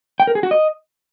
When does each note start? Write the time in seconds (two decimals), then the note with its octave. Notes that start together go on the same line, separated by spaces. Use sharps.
0.20 G5
0.27 A#4
0.35 G#4
0.43 F#4
0.51 D#5